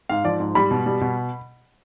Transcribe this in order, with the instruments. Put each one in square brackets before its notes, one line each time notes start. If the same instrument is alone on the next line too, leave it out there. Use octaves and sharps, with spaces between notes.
[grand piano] G#2 F5
F3 D5
G#2
G3 B5
B2
G3
B2